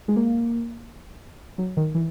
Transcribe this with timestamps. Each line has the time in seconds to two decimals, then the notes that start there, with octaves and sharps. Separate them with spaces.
0.08 G#3
0.16 A#3
1.58 F#3
1.77 D#3
1.95 E3